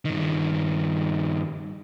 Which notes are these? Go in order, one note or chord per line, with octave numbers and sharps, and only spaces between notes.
G2 D#3